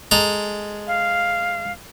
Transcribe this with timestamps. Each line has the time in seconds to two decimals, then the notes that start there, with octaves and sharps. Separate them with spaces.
0.11 G#3 A4 A#5
0.87 F5